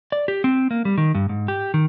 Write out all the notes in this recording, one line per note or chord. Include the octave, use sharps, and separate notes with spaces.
D5
G4
C4
A#3
G3
D#3
G2
G#2
G4
D#3